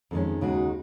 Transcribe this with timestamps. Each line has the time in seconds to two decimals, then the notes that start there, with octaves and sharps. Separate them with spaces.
0.11 F2 D#3 G#3 C#4
0.41 D#2 C#3 G#3 D#4 F#4